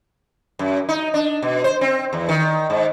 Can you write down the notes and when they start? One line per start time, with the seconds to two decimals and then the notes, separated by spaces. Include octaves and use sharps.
0.59 F#2
0.89 D#4
1.14 D4
1.42 B2
1.64 C5
1.81 C4
2.13 E2
2.29 D#3
2.70 G#2